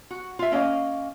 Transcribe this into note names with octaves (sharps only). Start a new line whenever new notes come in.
F#4
F4 E5
A#3 C#4 D#5 F5